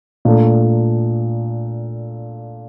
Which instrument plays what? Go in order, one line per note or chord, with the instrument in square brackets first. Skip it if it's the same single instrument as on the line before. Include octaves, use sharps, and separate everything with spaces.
[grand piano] A#2 A3 D4 A4